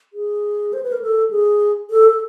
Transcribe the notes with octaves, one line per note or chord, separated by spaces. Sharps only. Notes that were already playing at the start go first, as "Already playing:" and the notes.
G#4
C5
B4
A#4
A4
G#4
A4
A4